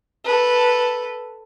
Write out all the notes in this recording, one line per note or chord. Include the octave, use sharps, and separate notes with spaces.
A4 B4